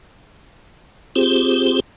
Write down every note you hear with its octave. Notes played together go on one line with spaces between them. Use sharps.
C4 F4 G4 G#4 C5